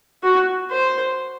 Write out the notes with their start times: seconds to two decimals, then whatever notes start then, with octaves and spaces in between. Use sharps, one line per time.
0.23 F#4
0.71 C5